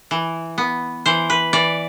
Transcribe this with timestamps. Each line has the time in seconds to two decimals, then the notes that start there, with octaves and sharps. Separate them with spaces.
0.11 E3
0.58 B3
1.06 E3 C5
1.30 B4
1.53 E3 D5